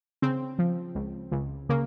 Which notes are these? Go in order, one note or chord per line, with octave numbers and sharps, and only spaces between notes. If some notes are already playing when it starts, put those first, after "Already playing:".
C#3 C4
F3
C#2
C#2
C#3 A#3